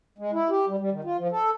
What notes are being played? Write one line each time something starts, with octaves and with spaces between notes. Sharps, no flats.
G#3
E4
G4
G3
G3
D#3
F4
F3
A4